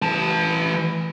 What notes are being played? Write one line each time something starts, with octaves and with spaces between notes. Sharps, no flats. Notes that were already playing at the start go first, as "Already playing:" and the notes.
E3 A5